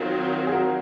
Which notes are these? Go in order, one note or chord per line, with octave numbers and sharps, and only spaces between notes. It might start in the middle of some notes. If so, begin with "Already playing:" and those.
Already playing: D#3 F#3 C4 F4 G#4
G#4
F#4 A#4